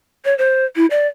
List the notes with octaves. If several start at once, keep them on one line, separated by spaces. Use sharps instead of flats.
C#5
C5
E4
D5